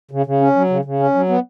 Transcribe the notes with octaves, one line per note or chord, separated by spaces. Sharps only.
C#3
C#3
C#4
F#3
C#3
C#3
C#4
F#3
B3